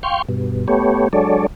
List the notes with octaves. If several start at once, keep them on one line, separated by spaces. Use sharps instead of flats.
F5 G5 C6 C#6
G2 B2
A3 B3 G4 C#5
F#3 G#3 D4 A4 C#5 D5